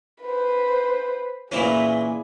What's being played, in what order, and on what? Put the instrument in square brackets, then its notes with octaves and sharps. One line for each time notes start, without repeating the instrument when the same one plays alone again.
[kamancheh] B4 C5
[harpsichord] A#2 E3 C#4 [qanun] E4 A#4 B4 [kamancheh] G#4